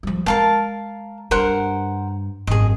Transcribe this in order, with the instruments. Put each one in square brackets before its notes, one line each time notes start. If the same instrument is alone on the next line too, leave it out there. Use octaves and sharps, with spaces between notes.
[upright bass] F3 G3
[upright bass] G#3 [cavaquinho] A#4 F5 A5
[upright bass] G2 [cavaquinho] A#4 C5 F#5
[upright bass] G#1 F#2 [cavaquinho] G#4 D#5